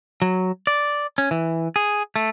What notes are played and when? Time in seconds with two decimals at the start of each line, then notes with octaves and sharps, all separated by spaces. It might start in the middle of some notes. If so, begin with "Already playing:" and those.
0.22 F#3
0.67 D5
1.18 C#4
1.31 E3
1.76 G#4
2.16 A3